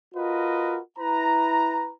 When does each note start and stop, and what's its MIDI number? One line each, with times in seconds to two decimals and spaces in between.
0.15 0.79 65
0.15 0.79 66
0.15 0.79 70
0.15 0.79 71
0.15 0.79 75
0.98 1.92 64
0.98 1.92 71
0.98 1.92 82